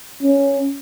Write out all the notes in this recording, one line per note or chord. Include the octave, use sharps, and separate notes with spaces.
C#4